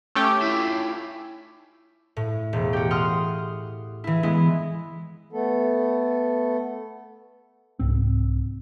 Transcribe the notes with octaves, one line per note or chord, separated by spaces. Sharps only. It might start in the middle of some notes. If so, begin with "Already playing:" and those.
A3 C#4 G4
E4 F4
A2
E1
F#4 G4
F#5 C6 D#6 F6
E3 E4
G#3 B3 E4
A3 B3 A4
C2 G#2 C4